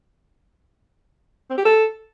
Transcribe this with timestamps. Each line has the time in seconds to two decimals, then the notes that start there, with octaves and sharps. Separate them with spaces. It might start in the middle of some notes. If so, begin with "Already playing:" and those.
1.50 C4
1.57 G4
1.65 A4